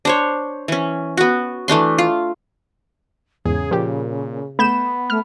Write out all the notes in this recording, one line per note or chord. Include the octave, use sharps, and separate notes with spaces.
D4 C5 C#5
E3 C#4
B3 F#4
E3 A3 D4 C6
F4
E2 G#2 C#3 G#4
A#2 F3 G4
A3 B3 B5 G6 E7
A3 F6